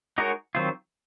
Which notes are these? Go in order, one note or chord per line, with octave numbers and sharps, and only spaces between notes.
G#3 D#4 F#4 A#4 C#5
D#3 F#3 C4 F4